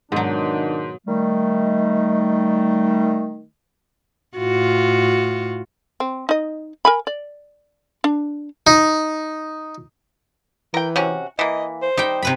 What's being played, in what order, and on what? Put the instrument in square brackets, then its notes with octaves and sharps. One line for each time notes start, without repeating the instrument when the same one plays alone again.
[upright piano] G#2 [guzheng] B2 F#3 [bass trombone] D#3 [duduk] D4
[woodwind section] D#3 G3 A3
[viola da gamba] A2 F4 F#4
[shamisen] C4
D#4 D#5
A#4 G#5 B5
D5
D4
[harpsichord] D#4
[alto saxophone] E3 [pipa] A#4 G5
[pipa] C3 C#4 F#4
[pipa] E3 A#3 [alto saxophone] D#5
[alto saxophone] C5
[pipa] G3 [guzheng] D#4 G5
[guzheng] C3 B4 B5